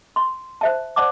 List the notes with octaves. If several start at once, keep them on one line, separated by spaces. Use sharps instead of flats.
C6
C5 E5 A5
C5 D5 F#5 A5 D6